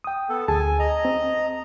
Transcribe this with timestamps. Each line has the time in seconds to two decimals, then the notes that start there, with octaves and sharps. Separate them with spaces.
0.04 G5 D#6
0.29 B3 A4
0.48 D2 G#4 G#5 A5
0.79 D#5 A#5
1.05 C4